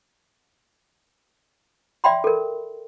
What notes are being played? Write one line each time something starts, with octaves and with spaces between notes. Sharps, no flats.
D5 E5 G5 B5 C6
A4 A#4